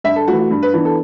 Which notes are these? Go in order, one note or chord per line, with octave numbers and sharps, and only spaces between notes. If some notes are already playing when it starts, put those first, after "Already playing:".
G2 E5
A4
E3 A3 F#4
F#4
G2
B4
E3 B3 D4
A4